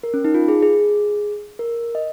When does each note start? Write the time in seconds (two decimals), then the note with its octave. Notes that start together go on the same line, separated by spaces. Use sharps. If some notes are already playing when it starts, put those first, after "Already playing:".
0.03 A#4
0.14 C#4
0.24 D#4
0.34 F4
0.48 G#4
0.63 G#4
1.59 A#4
1.95 D#5